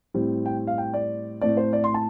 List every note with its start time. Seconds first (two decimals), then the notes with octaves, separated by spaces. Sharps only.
0.14 A2 G3 C4
0.46 G5
0.67 F5
0.78 G5
0.94 D5
1.41 A2 A3 C4 D5
1.57 C5
1.73 D5
1.84 C6
1.94 A5